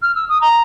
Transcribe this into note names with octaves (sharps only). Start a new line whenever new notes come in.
F6
E6
D#6
A#5